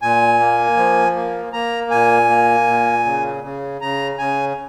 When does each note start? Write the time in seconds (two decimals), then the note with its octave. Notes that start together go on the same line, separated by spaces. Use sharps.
0.02 A#2 G#5
0.40 A#3
0.77 F3
1.16 A#3
1.53 A#3 A#5
1.91 A#2 G#5
2.29 A#3
2.67 A#2
3.05 C#3
3.43 C#3
3.81 C#3 A#5
4.18 C#3 G#5